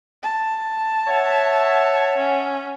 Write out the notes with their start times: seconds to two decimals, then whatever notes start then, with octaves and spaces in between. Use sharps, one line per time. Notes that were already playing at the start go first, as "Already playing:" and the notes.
0.23 A5
1.08 C#5 E5 F#5
2.18 C#4